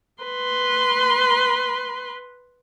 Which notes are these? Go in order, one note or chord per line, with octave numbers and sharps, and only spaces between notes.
B4 C6